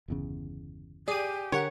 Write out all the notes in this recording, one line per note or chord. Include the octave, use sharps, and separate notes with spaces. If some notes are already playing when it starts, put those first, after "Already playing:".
G1 E2 C#3
G4 G#4 D5 D#7
D3 G4 A#4 C#5 F#5